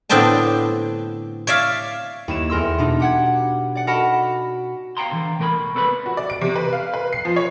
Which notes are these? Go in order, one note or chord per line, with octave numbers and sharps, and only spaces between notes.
A2 D3 B3 C4 D5 A5
C#5 D5 E5 F5
D#2 E4 E7
E2 A#4 C6 E6
B2 D4 D#4
G4 F#5 G#6
D5 F#5
F#4 A#4 D#5 F#5 A5 B5
F5 G5 A#5 C6
D3 E3
C2 A3 A#4 G5 B5
C4 A4 B4 D5 B5
F#4
D5
D7
C3
B4
F5
B4
C7
F3
C#5